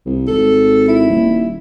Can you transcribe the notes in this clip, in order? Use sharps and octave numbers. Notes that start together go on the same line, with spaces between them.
C2
G#1 A4
E4
D#1